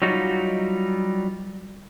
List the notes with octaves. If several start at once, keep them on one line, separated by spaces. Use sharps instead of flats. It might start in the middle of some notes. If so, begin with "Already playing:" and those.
F#3 G3 D#4 F4 F#4